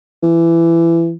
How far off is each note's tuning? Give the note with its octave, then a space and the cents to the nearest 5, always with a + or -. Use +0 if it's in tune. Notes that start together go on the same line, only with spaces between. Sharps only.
E3 +20